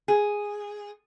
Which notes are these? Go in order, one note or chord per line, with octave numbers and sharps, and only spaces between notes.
G#4